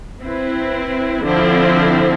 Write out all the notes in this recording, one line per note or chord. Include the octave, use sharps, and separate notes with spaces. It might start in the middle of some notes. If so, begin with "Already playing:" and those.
C4 E4 B4
D3 F3 C4 E4